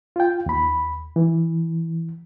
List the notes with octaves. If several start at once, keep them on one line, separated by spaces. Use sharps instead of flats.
F4 G5
D#2 B5
E3